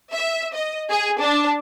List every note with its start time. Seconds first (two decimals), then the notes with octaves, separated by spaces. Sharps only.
0.12 E5
0.53 D#5
0.89 G#4
1.20 D4